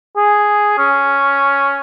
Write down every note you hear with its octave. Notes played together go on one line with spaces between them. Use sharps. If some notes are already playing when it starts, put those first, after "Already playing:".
G#4
C#4